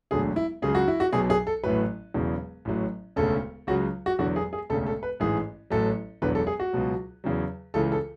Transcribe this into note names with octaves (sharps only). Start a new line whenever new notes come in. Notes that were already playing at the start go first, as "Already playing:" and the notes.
E1 D2 D3 F#3 G#4
E4
C#2 C#3 F#3 G#4
F#4
E4
F#4
B1 B2 F#3 G#4
G#4
A4
A1 A2 F#3 B4
E1 E2 C#3 F#3
A1 A2 F#3
E1 D2 C#3 A4
C#2 C#3 F#3 F#4
F#4
E1 E2 D3 F#3 F#4
G#4
G#4
E1 D2 C#3 A4
A4
B4
A1 G#2 E3 G#4
A1 A2 F#3 A4
E1 E2 D3 F#3 B4
A4
G#4
F#4
C#2 B2 F#3
E2 C#3 F#3
C#2 C#3 E3 A4
A4